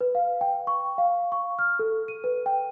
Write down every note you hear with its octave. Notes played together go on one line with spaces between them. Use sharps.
B4
F5
G5
C#6
F5
C#6
F6
A4
D#7
B4
G5